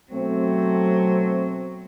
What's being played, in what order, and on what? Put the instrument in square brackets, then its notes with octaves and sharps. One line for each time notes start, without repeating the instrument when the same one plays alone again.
[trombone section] B2 A3 C4 [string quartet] F#3